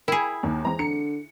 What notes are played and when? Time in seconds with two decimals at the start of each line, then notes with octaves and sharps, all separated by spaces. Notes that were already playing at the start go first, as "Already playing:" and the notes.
0.08 E4 G#4 A#4 G5 B5
0.43 D#2 D#3
0.65 E3 G#3 C4 A#5
0.79 D3 C#7